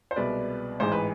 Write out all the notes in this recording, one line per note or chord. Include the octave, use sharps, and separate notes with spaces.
C5
C2 B2 G#3 B4 D5
A1 G#2 E3 G#3 C5
B4